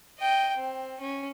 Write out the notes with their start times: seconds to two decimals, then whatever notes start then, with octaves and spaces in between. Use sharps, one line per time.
0.20 D#5 G5
0.57 C4
1.00 C#4